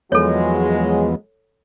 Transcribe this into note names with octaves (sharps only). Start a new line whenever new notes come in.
E2 F3 F#3 G#3 B3 A4 C#5